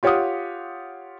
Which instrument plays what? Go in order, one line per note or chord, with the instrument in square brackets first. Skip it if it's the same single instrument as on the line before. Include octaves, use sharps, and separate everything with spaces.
[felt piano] F4 G4 C#5 F5 F#5 D#6